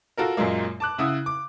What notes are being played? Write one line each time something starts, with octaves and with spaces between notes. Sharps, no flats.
F4 F#4 A4 A#4
F#2 A#2 F#3 G#3 A#3
A5 D6 F#6
C#3 E4 F#5 D#6
D6